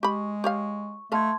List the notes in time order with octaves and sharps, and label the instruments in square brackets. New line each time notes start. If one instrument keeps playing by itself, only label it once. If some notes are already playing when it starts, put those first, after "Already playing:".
[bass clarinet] G#3 [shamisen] G4 B5 [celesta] C#6
[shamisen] G4 C#5 F5 [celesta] C#6
[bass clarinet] A3 [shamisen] D#5 F5 [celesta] A5 C6 G#6